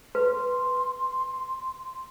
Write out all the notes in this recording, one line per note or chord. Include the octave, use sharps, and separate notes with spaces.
B4 C6